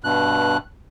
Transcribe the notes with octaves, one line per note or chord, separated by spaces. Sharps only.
G2 B2 F#6